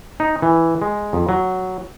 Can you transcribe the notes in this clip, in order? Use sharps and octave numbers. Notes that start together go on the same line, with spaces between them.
D#4
E3
G#3
F2
F#3